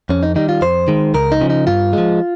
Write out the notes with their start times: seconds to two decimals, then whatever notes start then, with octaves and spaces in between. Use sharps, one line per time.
0.09 F2 C#4
0.23 D#4
0.36 D#3 G3 D#4
0.49 F4
0.62 F2 C5
0.88 D#3 G#3
1.14 C#2 A#4
1.32 D#4
1.41 C#3 F3
1.50 D#4
1.67 G2 F4
1.93 F3 G#3